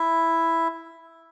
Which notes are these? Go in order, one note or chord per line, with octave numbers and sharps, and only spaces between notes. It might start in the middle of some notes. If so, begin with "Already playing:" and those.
Already playing: E4 E5